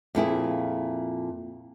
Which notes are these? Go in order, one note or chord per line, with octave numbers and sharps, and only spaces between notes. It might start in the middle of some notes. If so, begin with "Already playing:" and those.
F2 A#2 E4 G#4